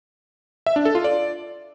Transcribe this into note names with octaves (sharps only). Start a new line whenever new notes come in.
E5
D4
A4
F4
D5